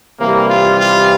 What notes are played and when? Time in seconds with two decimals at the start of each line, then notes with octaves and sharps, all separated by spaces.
0.19 C3 E3 G3 A#3
0.49 F4
0.79 F4